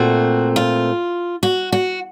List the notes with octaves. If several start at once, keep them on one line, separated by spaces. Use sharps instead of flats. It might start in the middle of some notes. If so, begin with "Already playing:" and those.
Already playing: A#2 A3 C4 F#4
F4
F#4
F#4